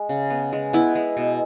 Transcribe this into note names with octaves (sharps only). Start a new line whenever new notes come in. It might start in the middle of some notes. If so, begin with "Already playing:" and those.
Already playing: G#3
C#3
B3
G#3
B3 E4
G#3
B2